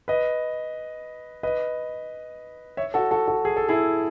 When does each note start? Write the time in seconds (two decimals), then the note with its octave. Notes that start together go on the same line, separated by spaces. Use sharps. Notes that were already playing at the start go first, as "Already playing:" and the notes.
0.08 B4 D#5
1.43 B4 D#5
2.77 C#5 E5
2.94 F#4 A4
3.11 F#4 A4
3.28 F#4 A4
3.45 G#4
3.57 A4
3.69 E4 G#4